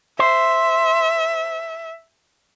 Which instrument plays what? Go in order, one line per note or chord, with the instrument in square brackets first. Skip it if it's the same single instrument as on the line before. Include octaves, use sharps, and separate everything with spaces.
[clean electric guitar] C5 [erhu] E5